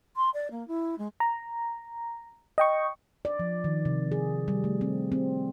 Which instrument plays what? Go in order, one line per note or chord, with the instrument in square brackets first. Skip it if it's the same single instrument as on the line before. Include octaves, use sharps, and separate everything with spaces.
[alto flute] C6
D5
A#3
E4
G#3
[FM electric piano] A#5
D#5 G5 C#6
[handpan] D5
F3
D#3
C3
G#4
G3
A3
C4
C4